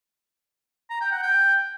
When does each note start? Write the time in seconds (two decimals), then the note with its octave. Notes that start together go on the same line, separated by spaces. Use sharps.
0.90 A#5
1.01 G5
1.12 F#5
1.23 G5